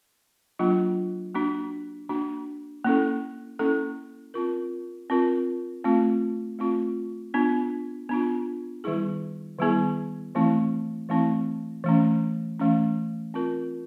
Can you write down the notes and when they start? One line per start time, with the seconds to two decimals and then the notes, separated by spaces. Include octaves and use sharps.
0.59 F#3 A#3 D4 F4
1.35 A#3 D4 F#4
2.09 A#3 D4 F#4
2.85 A#3 C#4 E4 A4
3.59 A#3 C#4 E4 A4
4.34 C4 F4 A#4
5.10 C4 F4 A#4
5.84 A3 C4 F4
6.59 A3 C4 F4
7.34 B3 D4 F4
8.09 B3 D4 F4
8.84 D#3 G3 B3 E4 G#4
9.59 D#3 G3 B3 E4 G#4
10.35 E3 A3 C4 E4
11.09 E3 A3 C4 E4
11.84 E3 A3 C#4
12.59 E3 A3 C#4
13.34 C4 F4 A#4